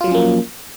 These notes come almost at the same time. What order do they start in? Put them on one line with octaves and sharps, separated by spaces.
F4 F#3 F3 C#4 A#3